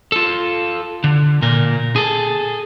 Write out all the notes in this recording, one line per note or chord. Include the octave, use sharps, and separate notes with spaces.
F4 A4
D3
A#2 A#4
G#4 A4